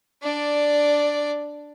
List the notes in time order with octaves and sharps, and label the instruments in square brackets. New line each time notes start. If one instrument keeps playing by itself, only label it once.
[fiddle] D4 D5